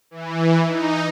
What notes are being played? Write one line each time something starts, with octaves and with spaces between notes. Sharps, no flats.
E3
D#4